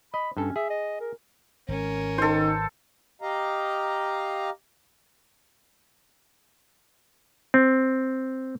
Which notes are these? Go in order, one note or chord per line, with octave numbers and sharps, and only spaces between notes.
D#5 B5
G2 C#4 A4
G#4 E5
D#5
A#4
G#1 C#4 A#4
D#3 A4 C5
G4 D#5 F5 A#5
C4